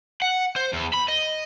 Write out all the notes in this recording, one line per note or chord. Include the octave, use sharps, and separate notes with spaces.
F#5
C5
E2
B5
D#5